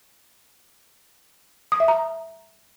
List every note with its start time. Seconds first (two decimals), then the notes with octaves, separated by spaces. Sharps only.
1.72 D#6
1.80 E5
1.88 A#5